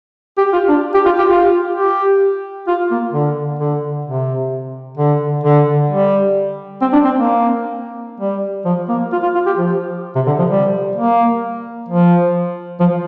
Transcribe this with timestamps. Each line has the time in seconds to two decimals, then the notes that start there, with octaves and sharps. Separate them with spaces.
0.38 G4
0.53 F4
0.68 D4
0.94 G4
1.06 F4
1.18 G4
1.29 F4
1.75 G4
2.68 F4
2.91 A#3
3.13 D3
3.59 D3
4.06 C3
4.98 D3
5.44 D3
5.90 G3
6.81 C4
6.93 D4
7.05 C4
7.16 A#3
8.21 G3
8.65 F3
8.89 A#3
9.12 F4
9.23 F4
9.35 F4
9.46 G4
9.58 F3
10.15 C3
10.27 D3
10.39 F3
10.50 G3
10.96 A#3
11.89 F3
12.80 F3